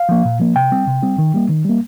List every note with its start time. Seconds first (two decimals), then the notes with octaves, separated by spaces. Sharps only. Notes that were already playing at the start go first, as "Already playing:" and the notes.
Already playing: F5
0.09 F3 A#3
0.25 A#2
0.40 F3 A#3
0.56 C3 G5
0.71 G3 C4
0.87 C3
1.02 G3 C4
1.18 D#3
1.34 G3 A#3
1.49 D#3
1.65 G3 A#3